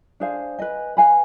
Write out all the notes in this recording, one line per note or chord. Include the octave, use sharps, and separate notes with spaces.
D4 G#4 C5 F5
B4 D#5 G#5
B4 F5 G#5 B5